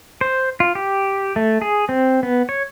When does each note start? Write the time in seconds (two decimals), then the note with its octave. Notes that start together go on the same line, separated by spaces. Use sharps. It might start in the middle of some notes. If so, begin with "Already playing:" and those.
0.21 C5
0.60 F4
0.75 G4
1.36 A3
1.62 G#4
1.89 C4
2.23 B3
2.49 C#5